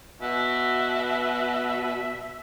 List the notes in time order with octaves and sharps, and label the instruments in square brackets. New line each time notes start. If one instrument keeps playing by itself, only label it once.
[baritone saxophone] B2 [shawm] E5